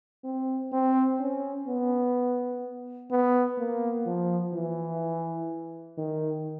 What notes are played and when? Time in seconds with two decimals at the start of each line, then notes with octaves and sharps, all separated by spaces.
0.24 C4
0.72 C4
1.20 C#4
1.68 B3
3.11 B3
3.58 A#3
4.06 F3
4.54 E3
5.98 D#3